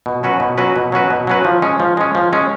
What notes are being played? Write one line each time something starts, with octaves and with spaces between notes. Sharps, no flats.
B2
F#3 C#4 F#4 B4
B2
F#3 C#4 F#4 B4
B2
F#3 C#4 F#4 B4
B2
F#3 C#4 F#4 B4
F3
G#3 C#4
F3
G#3 C#4
F3
G#3 C#4